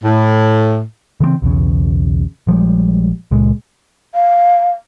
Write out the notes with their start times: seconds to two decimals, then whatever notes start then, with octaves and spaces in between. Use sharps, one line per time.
0.04 A2
1.20 C#3 E3 G#3 C4
1.42 B1 E2 C#3
2.47 A#1 F3 G3 G#3
3.31 C#2 A#2 G#3
4.15 F5